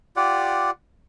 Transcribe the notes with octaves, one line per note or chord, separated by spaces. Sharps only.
F4 G4 D5 F#5